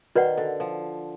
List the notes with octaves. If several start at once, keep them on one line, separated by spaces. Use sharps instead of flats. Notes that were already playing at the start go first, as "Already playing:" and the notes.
D#3 F#4 B4 D5 F#5
D3
F3